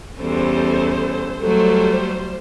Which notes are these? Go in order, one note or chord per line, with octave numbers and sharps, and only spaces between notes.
E2 G3 C#4 A4 C5
F#3 G3 A3 A4 C5